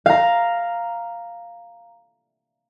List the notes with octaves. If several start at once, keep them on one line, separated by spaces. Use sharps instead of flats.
F5 A#5